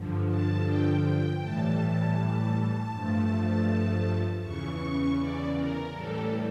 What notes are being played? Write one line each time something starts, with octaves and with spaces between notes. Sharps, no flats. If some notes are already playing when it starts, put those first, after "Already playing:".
Already playing: G2 D3 F3
A5
G5
G5
A2 E3 G3 A5
G2 F3 A3
E2 C#3 E3 C#6
D5
A#4
A2 E3 G3 A4